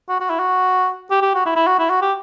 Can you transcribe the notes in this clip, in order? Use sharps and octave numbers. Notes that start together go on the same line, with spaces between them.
F#4
F#4
E4
F#4
G4
G4
F#4
E4
E4
F#4
E4
F#4
G4